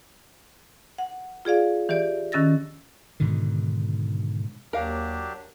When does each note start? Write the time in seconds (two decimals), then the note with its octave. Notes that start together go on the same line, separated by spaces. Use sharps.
0.98 F#5
1.45 F4 G#4 D5 F5
1.89 E3 G4 D5
2.32 D#3 C#4 E6 A6 A#6
3.20 G#2 B2 D3 D#3
4.73 D#2 F#3 D4 G4 A#4 F5